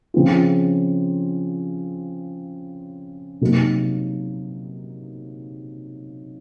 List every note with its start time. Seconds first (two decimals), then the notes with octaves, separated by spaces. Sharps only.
0.14 C#3 F3 C4 F4
3.41 C3 F#3 A#3 D#4